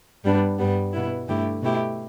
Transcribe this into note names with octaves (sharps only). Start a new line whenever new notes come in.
G2 G3 B3 D4
G2 G3 B3
B2 B3 E4
G2 D3 A3 E4 G4
B2 A3 E4 G4